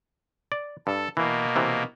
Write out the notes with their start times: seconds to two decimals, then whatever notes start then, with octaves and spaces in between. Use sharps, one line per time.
0.52 D5
0.87 G2 A4
1.17 B2 E3 A#3
1.56 C3 E3